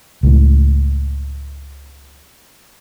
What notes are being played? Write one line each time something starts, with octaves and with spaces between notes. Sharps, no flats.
C#2 A2